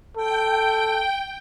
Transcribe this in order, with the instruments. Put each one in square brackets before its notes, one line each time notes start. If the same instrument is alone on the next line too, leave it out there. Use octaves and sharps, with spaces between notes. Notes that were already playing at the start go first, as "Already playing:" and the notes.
[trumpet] A4 [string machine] G5